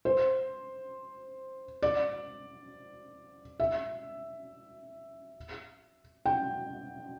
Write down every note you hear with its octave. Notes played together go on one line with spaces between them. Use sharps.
C5
D5
E5
G5